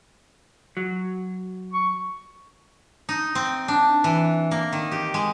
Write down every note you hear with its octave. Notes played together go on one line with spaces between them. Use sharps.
F#3
C#6
D#4
C4
D4
E3
A#3
D#3
G4
G#3